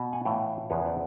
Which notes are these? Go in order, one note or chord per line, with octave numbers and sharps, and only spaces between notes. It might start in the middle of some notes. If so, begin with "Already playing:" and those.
Already playing: B2
F#5 G#5
A2 E3 F5 G5
E2 C#3 F3 B4 C#5
C5 D5